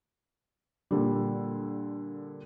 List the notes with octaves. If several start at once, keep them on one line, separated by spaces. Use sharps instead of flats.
A#2 D3 G3